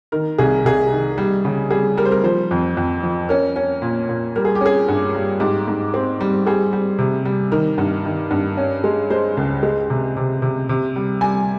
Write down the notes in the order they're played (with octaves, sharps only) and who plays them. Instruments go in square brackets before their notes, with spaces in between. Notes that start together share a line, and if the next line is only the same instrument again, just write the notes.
[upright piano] D#3 A#4
C2 G#4
C2 G#4
D#3
G3
C#3
G3 G#4
G3 A#4
C5
A#4
F3 C5
F2
F2
F3
C#4 A#4
C#4
A#2
A#2
G3 A#4
G#4
G4
C#4 G#4
G2
G3
G#2 G4
G#2
C4
G3
G3 G#4
G3
C3
G3
D#3 A#4
G2
D#3
G2
C#4
G#3
G#3 C5
C#2
G#3
C3
C3
C3
C3
G3
G3 G#5